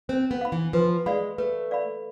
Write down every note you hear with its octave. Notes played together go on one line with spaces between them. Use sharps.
C4 C5
B3
F5 B5
E3
F3 B4
G#3 D5 F5 B5
A3 B4
D5 F5 B5